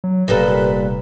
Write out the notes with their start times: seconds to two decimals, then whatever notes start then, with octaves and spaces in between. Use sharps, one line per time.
0.04 F#3
0.28 F1 A#2 G3 A4 B4